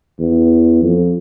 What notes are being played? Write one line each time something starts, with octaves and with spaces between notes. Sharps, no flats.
E2
F2